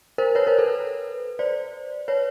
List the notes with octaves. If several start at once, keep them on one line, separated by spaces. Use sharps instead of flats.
A#4 C5
B4 C#5
A#4 C5
A4 B4
C5 D5
B4 C#5